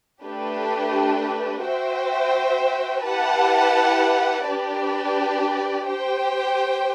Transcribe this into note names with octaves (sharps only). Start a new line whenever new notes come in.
A3 D4 G4 B4
F#4 C5 E5 G5
E4 G4 B4 F#5 A5
D4 G4 B4 D5
G4 C5 G5